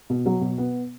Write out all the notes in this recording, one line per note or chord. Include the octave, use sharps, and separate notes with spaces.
B2
F#3
B2
B3